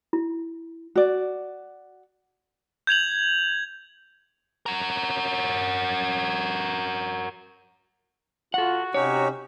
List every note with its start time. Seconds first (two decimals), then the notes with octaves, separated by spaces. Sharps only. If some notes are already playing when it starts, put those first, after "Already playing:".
0.13 E4
0.96 F#4 D5
2.87 G6 G#6 F7 F#7
4.66 F#4 A#4
8.54 F4 F#4 A4 F#5
8.94 C3 C#4 D#4 G4 C#5